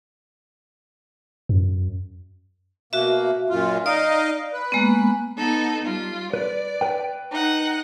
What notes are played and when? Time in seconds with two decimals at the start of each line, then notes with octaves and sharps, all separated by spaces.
1.49 F#2
2.93 B2 A#3 F#4 E5
3.50 F#2 A#2 F4
3.86 D#4 D5 D#5 F5
4.53 B4
4.72 G#3 A#3 B3
5.38 B3 D#4 A4
5.84 G3 F4
6.33 B4 D5
6.81 B4 G5
7.31 D#4 F#5